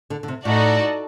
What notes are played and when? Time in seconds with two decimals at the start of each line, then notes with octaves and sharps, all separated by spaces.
0.10 D3
0.23 D3
0.28 C3
0.45 A2 D#4 F#4 A4 D5